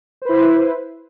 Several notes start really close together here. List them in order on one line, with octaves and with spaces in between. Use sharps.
C5 B4 E4